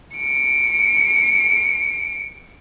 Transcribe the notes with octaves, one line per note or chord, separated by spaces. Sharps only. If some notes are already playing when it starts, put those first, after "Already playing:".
C#7 D7